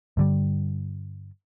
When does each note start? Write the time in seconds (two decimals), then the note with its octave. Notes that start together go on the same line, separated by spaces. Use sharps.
0.17 G2 D3 G3